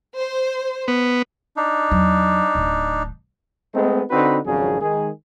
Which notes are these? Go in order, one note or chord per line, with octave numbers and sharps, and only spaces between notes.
C5
B3
D4 D#4
E2 F#3
D1 D#3
G#3 A3 B3 C4 D#4
D3 C4 D#4 F#4 B4
G#1 F2 C#3 F#3 D4 G#4
D#3 G#3 G#4